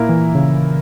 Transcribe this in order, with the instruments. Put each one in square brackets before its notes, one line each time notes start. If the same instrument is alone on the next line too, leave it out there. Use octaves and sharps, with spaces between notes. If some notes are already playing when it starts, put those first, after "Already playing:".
Already playing: [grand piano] A#2 A#3 E4 A#4
[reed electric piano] E3
C#3